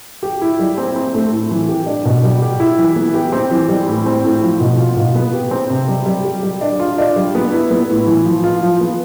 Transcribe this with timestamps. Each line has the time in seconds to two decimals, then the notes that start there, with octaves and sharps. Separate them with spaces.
0.23 G4
0.41 E4
0.59 G3
0.78 C4
0.96 C4
1.14 A3
1.32 A2
1.51 E3
1.69 G4
1.86 D4
2.05 B2
2.24 G3
2.42 G4
2.60 E4
2.79 E3
2.96 B3
3.14 G4
3.32 C4
3.51 E3
3.69 G3
3.88 A2
4.06 C4
4.24 A2
4.43 F3
4.60 B2
4.79 F4
4.96 B2
5.15 B3
5.33 G4
5.51 C4
5.70 C3
5.88 G3
6.06 G3
6.24 G4
6.43 G3
6.61 D4
6.80 F4
6.98 D4
7.16 G3
7.35 B3
7.52 E4
7.71 B3
7.89 A2
8.07 E3
8.25 F3
8.44 F4
8.62 F3
8.81 B3